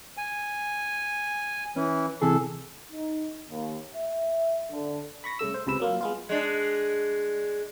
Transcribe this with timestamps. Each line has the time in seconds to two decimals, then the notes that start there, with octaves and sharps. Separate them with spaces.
0.17 G#5
1.76 E3 C#4
2.22 C3 E3 G#4 A4
2.91 D#4
3.50 D#2
3.94 E5
4.71 D3
5.24 B5 C#6 A#6
5.39 C2 C#3 A3 E6
5.54 C5
5.67 C#2 C3 B4 E6
5.80 F#3 A#3 F4
6.01 G#3 B3 F4
6.29 G#3 D4